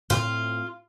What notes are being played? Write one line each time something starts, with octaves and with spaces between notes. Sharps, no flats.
A2 C4 F4